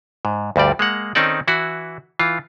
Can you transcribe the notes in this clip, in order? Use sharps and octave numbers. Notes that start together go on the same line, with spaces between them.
G#2
D2 G2 G3 D5
G#3 A#3 F#5
D#3 C4 C#4 D#4 A4 D5
E3 E4 F#4
E3 F4